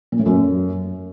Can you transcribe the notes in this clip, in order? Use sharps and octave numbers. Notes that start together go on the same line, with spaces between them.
A#2
A2
F#2